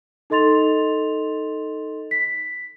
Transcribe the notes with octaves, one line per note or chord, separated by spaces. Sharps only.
D#4 A4 D#5 C6 A6 F7
B6